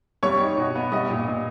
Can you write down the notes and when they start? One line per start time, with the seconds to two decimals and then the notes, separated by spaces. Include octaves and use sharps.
0.23 G3 C#5 C#6
0.41 D#4
0.58 B2
0.75 B3
0.92 G3 D#5 D#6
1.10 A#2
1.28 A#2